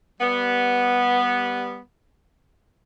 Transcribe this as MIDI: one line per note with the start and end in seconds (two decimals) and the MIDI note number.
0.21 1.80 55
0.21 1.80 59